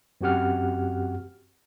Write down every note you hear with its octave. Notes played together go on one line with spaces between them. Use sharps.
F#2 C4 F#4 G4 F#5 F6